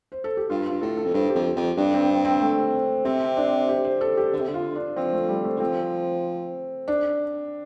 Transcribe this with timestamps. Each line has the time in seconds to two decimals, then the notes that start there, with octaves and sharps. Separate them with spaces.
0.12 C5
0.24 A4
0.37 G4
0.50 G2 F4
0.66 G2 F4
0.81 A2 A4
0.97 A4
1.05 F2
1.14 G2 C5
1.30 F2 G4
1.56 F2
1.77 G2 D4
1.94 C4
2.10 C4
2.25 C4
2.41 A3
3.05 C3 C4
3.37 D4
3.69 G4
3.84 C5
4.01 A4
4.17 G4
4.33 D3
4.40 C3
4.48 D3
4.54 F4
4.75 D4
4.96 F3 C4
5.13 A3
5.29 G3
5.44 A3
5.56 D3
5.60 F3 C4
6.88 D4